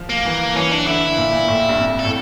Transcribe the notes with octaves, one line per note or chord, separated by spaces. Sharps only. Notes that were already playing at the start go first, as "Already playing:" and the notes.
Already playing: F3
A#3
E3
E3 C#4
D4
D3 E4
A#2
A#2
A2
G2
F2
A4
A2